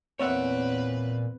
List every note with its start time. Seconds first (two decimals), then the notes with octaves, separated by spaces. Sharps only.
0.19 E2 A#2 C4 B4 C#5 E5 F#5